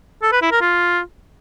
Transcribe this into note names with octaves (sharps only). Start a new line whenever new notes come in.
A4
B4
E4
A#4
F4